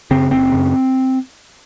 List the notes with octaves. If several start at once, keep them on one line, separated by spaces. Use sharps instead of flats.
F#2 C#3 C4
F#1 C4
F#2 C#3